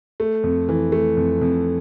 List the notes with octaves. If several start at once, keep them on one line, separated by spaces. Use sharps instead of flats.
A3
F2
E3
A3
F2
F2